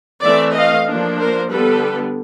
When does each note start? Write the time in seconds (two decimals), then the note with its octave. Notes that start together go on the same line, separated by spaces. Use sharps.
0.24 E3 A3 C4 D5 E5
0.55 D#5 F5
0.87 F3 A#3 D4
1.19 A#4 C5
1.50 D3 G3 B3 A4 B4